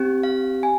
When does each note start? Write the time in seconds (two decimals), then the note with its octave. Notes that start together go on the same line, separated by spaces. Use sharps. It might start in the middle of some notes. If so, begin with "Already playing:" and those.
Already playing: C4 G4
0.23 F5
0.63 G#5